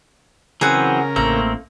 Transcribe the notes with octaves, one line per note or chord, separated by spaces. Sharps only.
C#3 E3 F#3 C4 G#4 A#4 F#5
A1 A3 A#3 C4 A#5